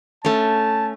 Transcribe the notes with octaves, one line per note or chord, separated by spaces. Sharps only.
A3 C#4 A5